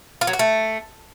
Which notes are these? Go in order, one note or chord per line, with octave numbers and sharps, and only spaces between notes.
F4
F#3
F#4
A3